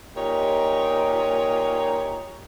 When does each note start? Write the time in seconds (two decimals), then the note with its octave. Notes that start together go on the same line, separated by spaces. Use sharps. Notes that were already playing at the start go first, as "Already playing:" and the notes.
0.16 A#2 D#4 G4 C#5